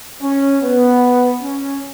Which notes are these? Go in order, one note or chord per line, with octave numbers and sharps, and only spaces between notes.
C#4
B3
C#4